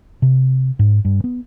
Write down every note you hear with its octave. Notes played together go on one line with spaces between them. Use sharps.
C3
G#2
G2
B3